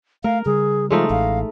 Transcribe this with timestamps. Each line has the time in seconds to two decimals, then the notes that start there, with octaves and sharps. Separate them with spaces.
0.24 A3 A#4 F5
0.46 C#3 G3 G#4
0.91 F3 G#3 A3 D#4
1.10 A1 F5